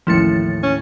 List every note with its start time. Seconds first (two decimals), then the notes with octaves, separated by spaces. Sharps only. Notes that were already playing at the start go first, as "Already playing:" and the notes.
0.07 A1 D#2 A2 F3 E4 A6 C#7
0.63 C#4